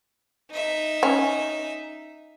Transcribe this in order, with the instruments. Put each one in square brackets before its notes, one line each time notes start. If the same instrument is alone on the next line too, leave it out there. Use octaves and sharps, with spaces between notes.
[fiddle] D#4 E5
[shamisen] C#4